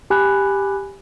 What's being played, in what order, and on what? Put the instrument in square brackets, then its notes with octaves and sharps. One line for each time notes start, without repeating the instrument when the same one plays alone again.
[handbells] G4 G#5 B5 F#6